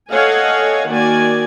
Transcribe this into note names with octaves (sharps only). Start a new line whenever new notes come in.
A4 C#5 D#5 F5 F#5 G#5
D#3 A#3 F#4 D5 G#5